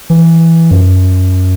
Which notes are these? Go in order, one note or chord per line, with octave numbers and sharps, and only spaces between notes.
E3
F#2